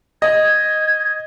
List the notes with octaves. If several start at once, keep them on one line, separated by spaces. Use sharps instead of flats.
D#5 G#6